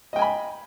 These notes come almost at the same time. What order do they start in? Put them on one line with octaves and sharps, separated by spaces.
D#5 G5 G#5 B5